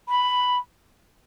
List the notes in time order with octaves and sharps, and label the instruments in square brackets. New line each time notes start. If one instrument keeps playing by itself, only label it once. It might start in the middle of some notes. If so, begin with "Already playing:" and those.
[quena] B5